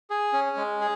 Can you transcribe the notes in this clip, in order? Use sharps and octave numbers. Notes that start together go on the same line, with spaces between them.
G#4
C#4
G#3
G#4